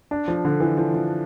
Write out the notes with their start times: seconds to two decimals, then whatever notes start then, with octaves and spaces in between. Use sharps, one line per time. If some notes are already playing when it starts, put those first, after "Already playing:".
0.11 D4
0.28 F3
0.45 D3
0.60 E3
0.77 F3
0.94 F3